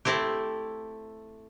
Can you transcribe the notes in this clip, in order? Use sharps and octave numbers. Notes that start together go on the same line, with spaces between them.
A3 C4 E4 G4